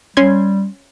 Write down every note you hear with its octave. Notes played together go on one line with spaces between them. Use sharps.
G3 C#4 C6 G#6